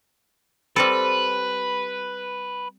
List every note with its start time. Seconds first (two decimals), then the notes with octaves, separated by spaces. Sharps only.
0.76 G3 C4 A4 B4